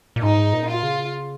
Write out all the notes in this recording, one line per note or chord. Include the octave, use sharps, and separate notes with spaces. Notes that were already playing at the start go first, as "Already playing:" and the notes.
A#2
G#2 D#4
A#2
F4
C#3